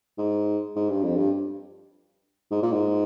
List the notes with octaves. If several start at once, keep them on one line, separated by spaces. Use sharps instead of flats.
G#2
G#2
G2
F2
G2
G#2
A#2
G#2